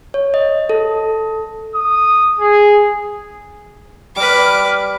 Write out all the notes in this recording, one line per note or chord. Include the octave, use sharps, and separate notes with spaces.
C#5
D#5
A4
D#6
G#4
G3 B4 B5 D6 F6